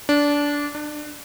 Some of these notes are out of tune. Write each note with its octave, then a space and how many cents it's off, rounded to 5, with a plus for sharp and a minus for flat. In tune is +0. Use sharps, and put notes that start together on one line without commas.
D4 -20
D4 +25